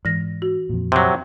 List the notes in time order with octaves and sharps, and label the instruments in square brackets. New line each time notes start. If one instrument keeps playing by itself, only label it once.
[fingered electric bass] G#2 [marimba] E3 A#6
[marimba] F#4
[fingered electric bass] F2 A#2
[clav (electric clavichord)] C3 F#3 [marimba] C6